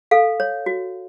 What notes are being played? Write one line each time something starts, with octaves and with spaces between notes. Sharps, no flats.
A4 F5
C#5
F#4